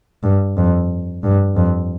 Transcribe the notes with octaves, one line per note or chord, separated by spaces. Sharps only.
G2
F2
G2
F2